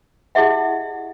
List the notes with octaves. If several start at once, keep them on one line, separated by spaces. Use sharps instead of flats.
E4 G4 G#4 D#5 E5 F#5